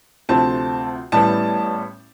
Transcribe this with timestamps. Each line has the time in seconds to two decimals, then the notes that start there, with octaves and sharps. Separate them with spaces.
0.29 D2 C3 F3 A3 C4 A5
1.12 A1 A2 G3 B3 A5